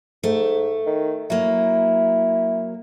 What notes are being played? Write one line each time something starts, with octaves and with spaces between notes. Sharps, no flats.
G#2 A3
D#3
F#3 A#3 E4